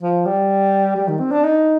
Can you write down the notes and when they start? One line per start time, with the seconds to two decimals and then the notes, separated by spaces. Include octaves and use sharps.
0.02 F3
0.25 G3
0.96 G3
1.08 D#3
1.20 C4
1.32 D4
1.43 D#4